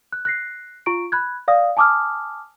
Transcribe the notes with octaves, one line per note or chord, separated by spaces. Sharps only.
F#6
F#6 A#6 C7
F4 C#6 D7
B5 F#6 G#6
D5 F5 D#6
G#5 A5 D6 D#6 F6